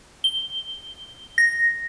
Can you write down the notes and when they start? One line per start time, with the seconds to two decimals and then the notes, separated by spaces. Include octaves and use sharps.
0.24 G7
1.38 A#6